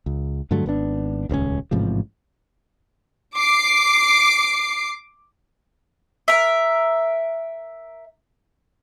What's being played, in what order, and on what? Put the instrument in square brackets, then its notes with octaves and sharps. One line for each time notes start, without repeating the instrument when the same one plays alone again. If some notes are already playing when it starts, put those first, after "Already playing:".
[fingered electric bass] C#2
G2 D3 F#3 A3
G#1 B3 D4
D#1 C#2 C4 C#4
A1 G#2 C3 F3
[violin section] D6 C7
[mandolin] A#4 E5